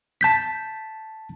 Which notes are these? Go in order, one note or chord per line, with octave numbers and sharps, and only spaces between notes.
A5 G6 B6